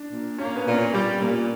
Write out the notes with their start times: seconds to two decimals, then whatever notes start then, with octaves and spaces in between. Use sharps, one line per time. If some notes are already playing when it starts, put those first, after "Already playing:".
Already playing: D4
0.11 A#2
0.38 A#3 C#4
0.56 B3
0.66 A#2
0.74 C#4
0.93 G3
1.19 A#2